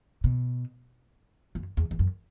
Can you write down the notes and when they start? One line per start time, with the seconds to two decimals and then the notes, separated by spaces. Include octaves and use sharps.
0.24 B2
1.55 F#2
1.77 E2
1.91 E2
1.99 F#2